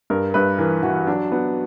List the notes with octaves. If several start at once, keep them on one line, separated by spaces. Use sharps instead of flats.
G2 A#4
G2 B4
E3 A#4
E3 F#4
F#3 D4
F#3 B3